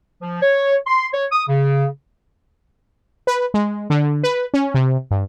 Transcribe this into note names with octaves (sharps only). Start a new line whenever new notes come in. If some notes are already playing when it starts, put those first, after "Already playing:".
F3
C#5
C6
C#5
D#6
C#3
B4
G#3
D3
B4
C#4
C3
G2